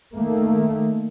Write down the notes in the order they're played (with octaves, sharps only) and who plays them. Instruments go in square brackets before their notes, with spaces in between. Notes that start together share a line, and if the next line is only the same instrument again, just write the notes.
[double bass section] D#3 A3 A#3